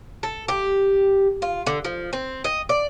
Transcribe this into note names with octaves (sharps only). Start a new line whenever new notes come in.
A4
G4
F4
D3
F3
C4
D#5
D5